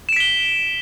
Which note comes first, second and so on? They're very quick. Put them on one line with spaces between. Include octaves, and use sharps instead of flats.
E7 D7 B6 G7